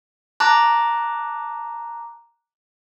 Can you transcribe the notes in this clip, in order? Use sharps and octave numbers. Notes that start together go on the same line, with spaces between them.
A5 A#5 D6 F#6